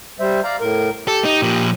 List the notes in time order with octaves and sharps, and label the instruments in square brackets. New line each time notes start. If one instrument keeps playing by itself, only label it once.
[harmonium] G3 C5 E5
D5 F5 A#5
A2 A#4
[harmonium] G4 [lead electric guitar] A4
[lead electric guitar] D#4
A#2 F3